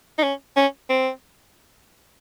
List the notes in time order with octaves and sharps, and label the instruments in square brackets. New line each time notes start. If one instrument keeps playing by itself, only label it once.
[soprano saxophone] D#4
C#4
C#4
C4